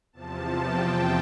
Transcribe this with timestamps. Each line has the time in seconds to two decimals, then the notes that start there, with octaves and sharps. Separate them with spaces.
0.13 E2 C3 F3 A5
0.60 G5